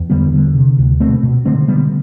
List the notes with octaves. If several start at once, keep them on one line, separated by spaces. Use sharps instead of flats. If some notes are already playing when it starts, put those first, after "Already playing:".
Already playing: E2
D3 G3 B3
D3
C3
D2
B2 A3 C4
B2
D3 A3 C4
D3 G3 B3